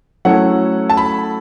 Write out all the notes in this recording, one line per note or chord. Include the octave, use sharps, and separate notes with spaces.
F#3 A3 C#4 E4 A4 F#5
A5
B5